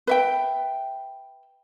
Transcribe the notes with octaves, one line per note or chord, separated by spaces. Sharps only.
B4 E5 G5